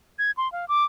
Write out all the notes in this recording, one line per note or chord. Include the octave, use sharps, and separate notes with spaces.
G#6
C6
F5
D6